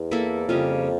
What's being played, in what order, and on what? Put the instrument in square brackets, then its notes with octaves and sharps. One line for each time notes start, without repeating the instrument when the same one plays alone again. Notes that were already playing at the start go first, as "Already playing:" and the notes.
Already playing: [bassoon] E2
[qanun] A#3 E4 A4
[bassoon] F2 [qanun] C#3 G3 C#4 F4